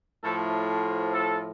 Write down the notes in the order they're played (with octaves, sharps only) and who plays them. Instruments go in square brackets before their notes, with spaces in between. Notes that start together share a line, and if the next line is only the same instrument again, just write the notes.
[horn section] A2 F3 A4
A4